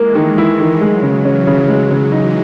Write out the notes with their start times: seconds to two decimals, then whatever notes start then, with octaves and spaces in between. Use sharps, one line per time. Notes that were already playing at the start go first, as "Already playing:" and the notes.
Already playing: E3 G#3 A#3
0.15 D#3
0.38 E3 G#3 E4
0.60 D#3
0.81 F#3 G#3
1.03 C#3
1.25 E3 C#4
1.47 C#3
1.68 F#3 G#3
1.91 C#3
2.12 E3 G#3 D#4